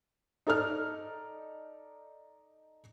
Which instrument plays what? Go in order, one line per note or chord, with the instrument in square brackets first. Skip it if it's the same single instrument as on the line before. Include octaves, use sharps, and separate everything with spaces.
[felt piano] D#4 A4 D5 F6